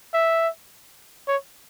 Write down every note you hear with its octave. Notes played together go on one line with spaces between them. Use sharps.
E5
C#5